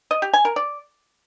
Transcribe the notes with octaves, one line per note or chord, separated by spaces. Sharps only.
D#5
G4
G#5
A#4
D5